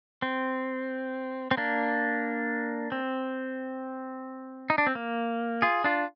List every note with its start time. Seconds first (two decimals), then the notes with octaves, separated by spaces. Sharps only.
0.22 C4
1.51 C4
1.57 A#3 D4
2.92 C4
4.70 D#4
4.78 D4
4.87 C4
4.95 A#3
5.62 F4 G#4
5.84 D4 F4